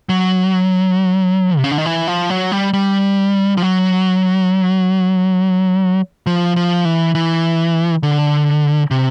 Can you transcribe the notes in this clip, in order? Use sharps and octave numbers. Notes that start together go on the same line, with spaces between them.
F#3
C3
C#3
D3
D#3
E3
F3
F#3
G3
G3
F3
F#3
F3
F3
E3
E3
D3
C3